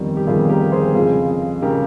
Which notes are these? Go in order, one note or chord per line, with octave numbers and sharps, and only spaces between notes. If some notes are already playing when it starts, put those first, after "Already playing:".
Already playing: G1 F2 D#3 G3
G4
G1 F2 D#3 G3 F4 G#4
G4 A#4
G#4 C5
F2 C#3 G#3 F4 G#4
C#3 G#3 G4 A#4